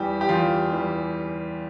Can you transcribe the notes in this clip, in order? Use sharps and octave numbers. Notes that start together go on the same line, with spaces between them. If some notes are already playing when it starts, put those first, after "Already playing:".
Already playing: E2 E3 G3 G4
G4
E2 F4
E3 G3